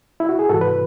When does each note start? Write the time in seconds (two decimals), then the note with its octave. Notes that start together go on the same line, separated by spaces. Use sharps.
0.20 E4
0.29 F#4
0.39 G#4
0.49 G#2 F#4 A4
0.53 E3
0.61 B4